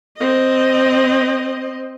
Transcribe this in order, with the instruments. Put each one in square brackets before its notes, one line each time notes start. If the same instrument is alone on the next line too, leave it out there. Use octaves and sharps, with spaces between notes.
[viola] C4 D#5